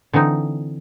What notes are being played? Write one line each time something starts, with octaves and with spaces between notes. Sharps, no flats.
D3 E3 C4 D#4